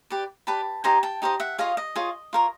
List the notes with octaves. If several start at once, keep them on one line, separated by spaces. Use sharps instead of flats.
G4 B4 D5
G4 B4 D5 A5 B5
D#4 G4 C5 G#5 A#5
G5 A5
D#4 G4 C5 D#5
E5 F#5
F4 G#4 C#5 D#5 F5
D#5
F4 G#4 C#5
F4 A#4 C#5